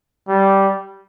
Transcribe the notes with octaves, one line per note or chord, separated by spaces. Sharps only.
G3